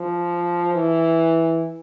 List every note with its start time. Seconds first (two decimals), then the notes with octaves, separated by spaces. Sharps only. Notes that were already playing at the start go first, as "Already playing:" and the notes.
Already playing: F3
0.74 E3